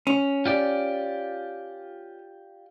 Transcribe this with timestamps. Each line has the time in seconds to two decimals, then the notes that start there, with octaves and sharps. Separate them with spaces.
0.07 C#4
0.46 F4 G4 D5